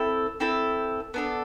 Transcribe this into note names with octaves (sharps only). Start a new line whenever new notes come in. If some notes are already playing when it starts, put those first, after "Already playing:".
Already playing: C4 E4 A4
C4 E4 A4
B3 D4 A4